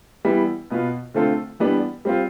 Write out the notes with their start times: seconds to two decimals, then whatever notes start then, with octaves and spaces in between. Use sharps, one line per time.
0.25 E3 G3 B3 E4
0.70 B2 B3 F4
1.14 D3 A3 C4 F4 A4
1.60 E3 G3 B3 D4
2.05 G3 C4 F4